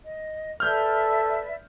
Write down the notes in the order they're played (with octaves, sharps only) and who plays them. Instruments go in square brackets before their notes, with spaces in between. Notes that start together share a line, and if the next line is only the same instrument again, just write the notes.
[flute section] D#5
[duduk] A4 [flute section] B4 D5 E5 [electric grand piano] F6 G6